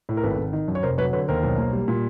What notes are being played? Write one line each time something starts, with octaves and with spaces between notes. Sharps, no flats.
A2
A#4
G#1 A4 B4
G#1
D#3
F#2
C#5
F1 A#4 C5
F#3 B4 C#5
D3 B4 C#5
D#2 A#4 C5
B1
A#3
G3
A#2